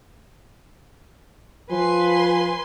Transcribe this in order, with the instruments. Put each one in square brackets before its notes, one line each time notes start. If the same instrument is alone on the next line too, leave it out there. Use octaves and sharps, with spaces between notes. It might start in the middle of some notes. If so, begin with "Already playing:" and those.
[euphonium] F3 [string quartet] B4 G#5 C6